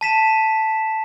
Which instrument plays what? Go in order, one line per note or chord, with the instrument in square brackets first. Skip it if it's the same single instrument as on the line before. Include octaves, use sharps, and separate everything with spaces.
[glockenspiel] A5 B6 E7